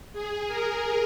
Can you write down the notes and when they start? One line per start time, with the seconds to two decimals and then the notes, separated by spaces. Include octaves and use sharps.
0.13 G#4
0.48 A#4